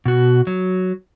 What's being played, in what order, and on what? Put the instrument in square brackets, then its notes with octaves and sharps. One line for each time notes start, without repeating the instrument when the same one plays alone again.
[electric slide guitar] B2 F#4
F#3